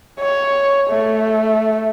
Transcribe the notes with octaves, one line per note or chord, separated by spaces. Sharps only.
C#5
A3